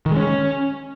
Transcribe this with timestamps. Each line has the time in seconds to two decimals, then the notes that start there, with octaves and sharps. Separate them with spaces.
0.06 D#3
0.11 G#3
0.16 C#4